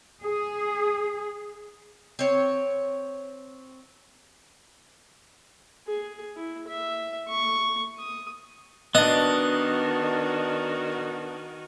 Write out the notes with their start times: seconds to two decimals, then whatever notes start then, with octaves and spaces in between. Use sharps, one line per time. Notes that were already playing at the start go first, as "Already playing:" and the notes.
0.23 G#4
2.19 C4 C#5
5.87 G#4
6.36 E4
6.67 E5
7.27 C#6
7.98 D#6
8.95 D#3 B3 D4 F#4 D#5